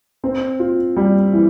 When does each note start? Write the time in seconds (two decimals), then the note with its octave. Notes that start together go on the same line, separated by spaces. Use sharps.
0.24 C4
0.59 F4
0.96 G3
1.33 E3